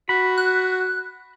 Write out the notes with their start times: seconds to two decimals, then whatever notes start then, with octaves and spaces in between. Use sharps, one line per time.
0.09 F#4 B5
0.37 F#6